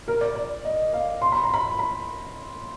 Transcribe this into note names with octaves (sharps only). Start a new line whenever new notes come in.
A#4
D5
D5
D#5
F5
C6
B5
A#5
B5
B5